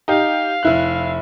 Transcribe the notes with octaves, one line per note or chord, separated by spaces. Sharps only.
D#4 G4 F5
F1 E4 F#6